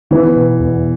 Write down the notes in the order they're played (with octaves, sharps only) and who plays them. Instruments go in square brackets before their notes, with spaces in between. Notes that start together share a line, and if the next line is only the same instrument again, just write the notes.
[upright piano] E3 [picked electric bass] B3
[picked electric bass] B2
E2